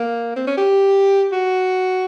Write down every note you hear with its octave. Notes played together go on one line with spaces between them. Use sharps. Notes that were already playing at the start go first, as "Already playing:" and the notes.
Already playing: A#3
C4
C#4
G4
F#4